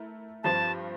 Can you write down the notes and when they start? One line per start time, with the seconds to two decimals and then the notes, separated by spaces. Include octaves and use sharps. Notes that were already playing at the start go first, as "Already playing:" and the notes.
Already playing: A3 E4 A#4
0.43 G2 F3 C4 A5